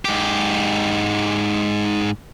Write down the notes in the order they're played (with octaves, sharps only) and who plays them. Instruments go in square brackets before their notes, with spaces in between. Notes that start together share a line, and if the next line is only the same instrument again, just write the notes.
[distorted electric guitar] G#2 G4